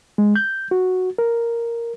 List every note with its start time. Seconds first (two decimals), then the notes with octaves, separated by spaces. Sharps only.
0.18 G#3
0.36 G6
0.71 F#4
1.18 A#4